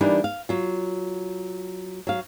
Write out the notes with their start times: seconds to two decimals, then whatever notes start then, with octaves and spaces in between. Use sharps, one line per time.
0.01 E3 G3 A#3 D4 D#4
0.24 F5
0.49 F#3 F4
2.07 F#3 F5